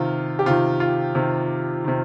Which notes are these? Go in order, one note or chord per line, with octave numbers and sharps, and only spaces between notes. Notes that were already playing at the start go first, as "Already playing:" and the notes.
Already playing: C3 D#3 F4
G4
C3 D#3 F4
F4
C3 D#3
C3 D#3